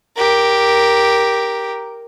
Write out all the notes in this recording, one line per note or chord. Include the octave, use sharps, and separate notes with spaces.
G4 A#4